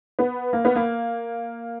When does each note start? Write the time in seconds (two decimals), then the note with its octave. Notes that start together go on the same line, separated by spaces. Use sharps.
0.19 B3
0.53 A#3
0.65 B3
0.76 A#3